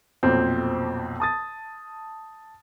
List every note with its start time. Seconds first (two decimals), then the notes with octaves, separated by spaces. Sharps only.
0.23 B1 F2 A#2 C4
1.20 A5 D#6 A6